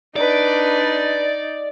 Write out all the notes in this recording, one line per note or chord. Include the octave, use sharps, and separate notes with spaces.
D4 D#4 B4 D5